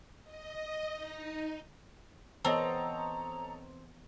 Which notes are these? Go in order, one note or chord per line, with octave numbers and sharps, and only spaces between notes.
D#5
D#4
E3 B3 C4 A4 C#5 D#5 A#5